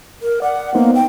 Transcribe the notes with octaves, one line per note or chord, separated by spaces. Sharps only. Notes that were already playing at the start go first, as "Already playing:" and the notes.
A#4
D5 F#5
A#3 B3 D#4 C5
G5